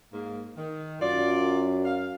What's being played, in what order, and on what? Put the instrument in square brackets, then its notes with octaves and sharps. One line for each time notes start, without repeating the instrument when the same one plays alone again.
[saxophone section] G#2 A#3
D#3
[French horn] F#2 [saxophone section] F4 D5
[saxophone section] F5